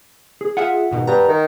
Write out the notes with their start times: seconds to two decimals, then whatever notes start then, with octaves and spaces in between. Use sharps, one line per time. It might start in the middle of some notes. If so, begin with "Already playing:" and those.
0.41 G#4
0.57 F4 G#4 E5 F#5
0.91 G#2 B2 D#3
1.07 G2 A#5
1.28 D#3